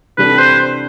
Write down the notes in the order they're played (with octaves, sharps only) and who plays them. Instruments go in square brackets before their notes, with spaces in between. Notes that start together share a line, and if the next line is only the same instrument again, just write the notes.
[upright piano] C3 E3 G3 D4 A4 [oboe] B4
[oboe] C5